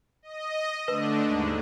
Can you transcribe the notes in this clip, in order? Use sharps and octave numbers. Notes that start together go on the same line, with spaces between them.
D#5
D3 A3 D4 B4
D#2 G#2 D3